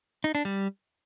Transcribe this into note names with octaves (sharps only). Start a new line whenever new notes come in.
D#4
D4
G3